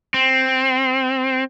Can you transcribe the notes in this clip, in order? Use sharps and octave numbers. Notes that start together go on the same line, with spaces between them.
C4